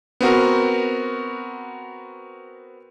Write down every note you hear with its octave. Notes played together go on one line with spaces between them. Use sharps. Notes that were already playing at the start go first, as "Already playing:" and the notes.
B3 C4 F#4 A#4